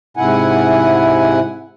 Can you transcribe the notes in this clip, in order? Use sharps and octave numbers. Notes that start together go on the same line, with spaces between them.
G#2 C3 E4 F#5 G#5